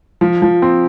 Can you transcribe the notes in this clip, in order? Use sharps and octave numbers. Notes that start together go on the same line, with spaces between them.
F3
F3
C4